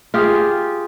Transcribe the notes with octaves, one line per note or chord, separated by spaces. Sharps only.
F4 G4 G#4